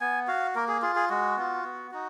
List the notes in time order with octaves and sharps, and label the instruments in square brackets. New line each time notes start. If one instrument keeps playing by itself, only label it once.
[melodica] B3 G#5
F#4 F5
A#3 A#4
G#4
F4 G#4
G#4
G#3 F#4
B3 F4
B3
D#4 F#4